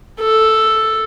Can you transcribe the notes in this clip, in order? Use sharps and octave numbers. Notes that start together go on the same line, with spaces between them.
A4